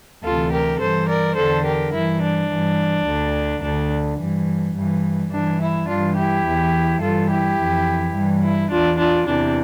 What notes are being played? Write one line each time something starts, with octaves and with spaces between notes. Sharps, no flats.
D2 C3 E3 F4 A4
G4 A#4
G2 E3 A4 C5
A#4 D5
E2 D3 A4 C5
G4 A#4
G2 E3 E4
D4
G2 E3
D2 D3
D2 D3 D4
G2 E3
G2 E3
G2 E3 D4
E4
G2 E3 D4 F4
E4 G4
E2 E3
G2 E3 F4 A4
E4 G4
F2 E3
G2 E3
E4
E2 E3 D4 F4
D4 F4
E2 C3 E3 D4